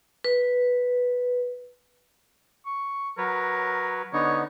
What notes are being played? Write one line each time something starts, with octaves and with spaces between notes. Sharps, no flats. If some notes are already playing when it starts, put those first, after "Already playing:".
B4
C#6
F#3 A#4 B4 C#5
D3 B3 D#4 C#5